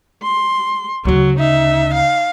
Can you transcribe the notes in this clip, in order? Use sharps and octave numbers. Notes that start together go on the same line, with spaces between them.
C6
D2 C#3 F#3
D#4 E5
F5